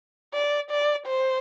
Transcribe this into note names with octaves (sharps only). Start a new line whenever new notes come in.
D5
D5
C5